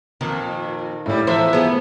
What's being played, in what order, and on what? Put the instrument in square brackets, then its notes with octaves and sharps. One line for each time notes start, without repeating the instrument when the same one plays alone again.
[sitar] F2 A#2 [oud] D#3
[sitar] F#2 G3 [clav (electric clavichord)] A2 E4
[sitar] E2 F3 E5 [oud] C5
[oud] B3 G#4